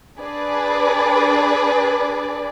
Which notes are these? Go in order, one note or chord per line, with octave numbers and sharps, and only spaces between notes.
D4 G#4 B4 D5